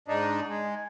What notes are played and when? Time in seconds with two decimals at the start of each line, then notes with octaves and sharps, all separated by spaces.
0.08 G#2 D4 D#4
0.48 G#3